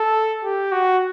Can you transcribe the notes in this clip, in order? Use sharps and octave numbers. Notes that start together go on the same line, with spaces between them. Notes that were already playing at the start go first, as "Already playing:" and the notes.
Already playing: A4
G4
F#4